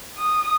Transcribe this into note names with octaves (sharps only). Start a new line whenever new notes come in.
D#6